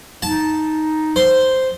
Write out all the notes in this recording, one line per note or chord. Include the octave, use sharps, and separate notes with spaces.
D#4 A5
C5